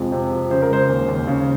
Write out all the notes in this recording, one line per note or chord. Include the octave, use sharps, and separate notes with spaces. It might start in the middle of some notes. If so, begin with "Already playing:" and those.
Already playing: F2 C3 F3 G#3
C3
F3
C#3 C5
A#4
G#3 C5
D#2
D#2
C#3